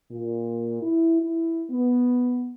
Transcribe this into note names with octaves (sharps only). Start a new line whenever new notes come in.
A#2
E4
E4
B3